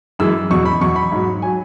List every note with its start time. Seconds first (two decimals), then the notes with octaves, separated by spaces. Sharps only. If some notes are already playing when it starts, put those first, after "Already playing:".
0.19 F#2 E3 G#3 E6
0.50 E2 B2 F#3 C#6
0.65 B5
0.81 E2 B2 F#3 C#6
0.96 B5
1.12 G#2 F#3
1.42 F#3 G#5